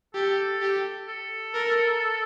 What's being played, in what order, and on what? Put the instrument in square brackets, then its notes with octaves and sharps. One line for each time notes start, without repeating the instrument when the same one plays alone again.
[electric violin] G4 [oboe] A4
[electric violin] G4
[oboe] A4
[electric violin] A#4